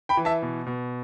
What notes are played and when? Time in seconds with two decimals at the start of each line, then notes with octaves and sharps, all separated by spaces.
0.09 G5 B5
0.17 E3
0.25 E5 A5
0.42 B2
0.67 B2